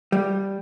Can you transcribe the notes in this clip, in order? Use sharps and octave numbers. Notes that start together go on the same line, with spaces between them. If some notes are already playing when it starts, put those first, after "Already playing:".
G3